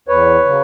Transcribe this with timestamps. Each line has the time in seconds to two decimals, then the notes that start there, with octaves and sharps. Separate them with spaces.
0.08 E2 B4 C#5
0.45 C#3 F#3